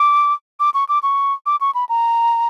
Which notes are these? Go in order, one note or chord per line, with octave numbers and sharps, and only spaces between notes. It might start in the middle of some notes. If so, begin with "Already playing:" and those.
Already playing: D6
D6
C#6
D6
C#6
D6
C#6
B5
A#5